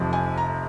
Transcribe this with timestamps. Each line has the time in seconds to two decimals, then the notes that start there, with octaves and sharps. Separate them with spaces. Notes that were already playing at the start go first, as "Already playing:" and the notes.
Already playing: F1 F2 C3 F3
0.13 G#5
0.37 A#5